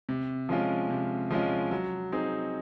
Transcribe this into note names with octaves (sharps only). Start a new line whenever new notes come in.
C3
F3 G#3 C#4 F4
C3
F3 G#3 C#4 F4
F#3
C4 D#4 G#4